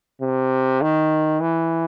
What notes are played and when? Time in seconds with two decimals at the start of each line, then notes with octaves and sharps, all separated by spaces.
0.22 C3
0.81 D#3
1.40 E3